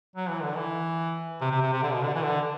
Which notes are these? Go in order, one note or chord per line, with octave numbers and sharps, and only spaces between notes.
F#3
E3
D3
E3
C3
C3
C3
C3
D3
B2
D3
E3
D3